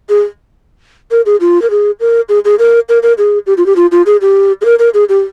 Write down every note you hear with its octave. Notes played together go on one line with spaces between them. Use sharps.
G#4
A#4
G#4
F4
A#4
G#4
A#4
G#4
G#4
A#4
A#4
A#4
G#4
G4
F4
G4
F4
F4
G#4
G4
G#4
A#4
A#4
G#4
G4